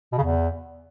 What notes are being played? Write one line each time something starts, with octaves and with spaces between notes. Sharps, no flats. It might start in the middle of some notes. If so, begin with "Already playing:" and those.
B2
C#3
E2